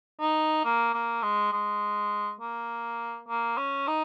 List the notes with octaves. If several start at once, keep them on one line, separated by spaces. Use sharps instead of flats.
D#4
A#3
A#3
G#3
G#3
A#3
A#3
C#4
D#4